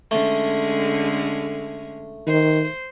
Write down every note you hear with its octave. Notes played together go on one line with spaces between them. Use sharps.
D3 G#3 A3 C#4
D#3 C5